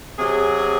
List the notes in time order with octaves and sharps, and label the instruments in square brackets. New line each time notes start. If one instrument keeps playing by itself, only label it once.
[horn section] C3 F#3 G#4